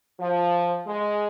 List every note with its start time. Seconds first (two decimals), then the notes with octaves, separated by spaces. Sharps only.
0.20 F3
0.86 G#3